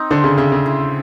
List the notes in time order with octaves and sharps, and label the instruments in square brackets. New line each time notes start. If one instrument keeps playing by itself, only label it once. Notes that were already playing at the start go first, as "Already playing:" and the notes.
Already playing: [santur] C4 D#4
[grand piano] D3 [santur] C5
[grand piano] C#3
[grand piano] C#3 [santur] E5
[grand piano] C#3
[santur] E4